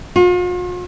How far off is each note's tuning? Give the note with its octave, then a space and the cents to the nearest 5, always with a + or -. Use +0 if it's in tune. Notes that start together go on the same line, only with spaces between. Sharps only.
F4 +45